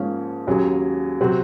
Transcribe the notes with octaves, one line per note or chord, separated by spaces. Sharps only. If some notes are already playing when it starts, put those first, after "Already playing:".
Already playing: G#2 F3 A#3 C#4
D#2 C#3 F#3 C#4 G#4
C3 F#3 C4 F#4